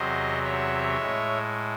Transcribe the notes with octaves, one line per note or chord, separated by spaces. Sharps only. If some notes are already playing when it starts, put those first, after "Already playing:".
Already playing: E2 C3 F#3 C5 D#5
C#5 E5
A2 G#3